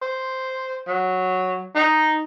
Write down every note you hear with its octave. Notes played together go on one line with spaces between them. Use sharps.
C5
F#3
D#4